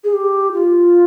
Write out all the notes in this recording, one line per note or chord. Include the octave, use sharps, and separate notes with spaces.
G#4
G4
F4